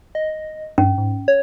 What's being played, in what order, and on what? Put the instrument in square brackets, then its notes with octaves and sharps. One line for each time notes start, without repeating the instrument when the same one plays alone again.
[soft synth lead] D#5
[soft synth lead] G2 [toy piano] C#4
[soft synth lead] G#2
C#5